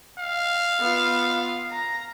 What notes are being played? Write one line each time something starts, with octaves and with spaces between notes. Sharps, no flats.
F5
B3 F4
A#5